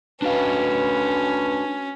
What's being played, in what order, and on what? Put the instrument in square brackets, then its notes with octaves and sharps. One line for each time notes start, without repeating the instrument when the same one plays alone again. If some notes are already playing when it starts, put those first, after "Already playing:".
[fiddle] C#4 [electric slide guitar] D4 F#4 F5 [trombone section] B4